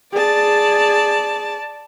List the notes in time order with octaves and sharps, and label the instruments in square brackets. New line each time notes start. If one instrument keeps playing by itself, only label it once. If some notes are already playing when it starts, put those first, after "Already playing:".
[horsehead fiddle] G#4 [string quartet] D5 A5